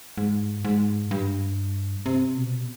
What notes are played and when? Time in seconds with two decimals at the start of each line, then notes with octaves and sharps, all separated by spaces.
0.18 G#2
0.65 G#2
1.11 G2
2.06 C3
2.37 B2